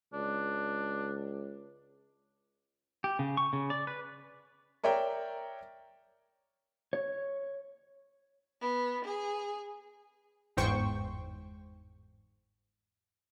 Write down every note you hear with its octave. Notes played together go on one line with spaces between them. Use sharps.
C#2 D4
G4
C#3
C#6
C#3
D5
B4
A#4 C#5 D5 E5 G5 A#5
C#5
B3
G#4
G1 E2 G#2 C5 G5 C#6